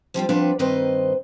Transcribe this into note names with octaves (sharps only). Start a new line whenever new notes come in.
F3 G3 C4 F4
F3 C4 D4 B4 F#5
G2 D#3 C4 B4 C5 D#5